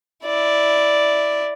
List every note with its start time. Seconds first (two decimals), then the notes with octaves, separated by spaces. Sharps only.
0.25 E4 D5